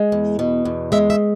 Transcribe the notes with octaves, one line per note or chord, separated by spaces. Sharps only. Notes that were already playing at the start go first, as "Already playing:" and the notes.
Already playing: G#3
E2
B2
E2
G#3 E5
E5